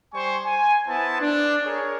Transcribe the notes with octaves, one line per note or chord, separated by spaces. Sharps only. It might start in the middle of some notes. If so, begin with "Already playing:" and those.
G3 C5 G#5 C#6
G#5
B3 E4 C5 A5
D4
G#4 A#4 C#5